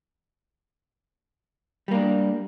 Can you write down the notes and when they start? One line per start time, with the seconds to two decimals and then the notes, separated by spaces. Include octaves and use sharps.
1.88 G3
1.91 A#3
1.94 D4